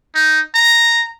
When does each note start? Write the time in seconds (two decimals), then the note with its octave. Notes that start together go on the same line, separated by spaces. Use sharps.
0.15 D#4
0.54 A#5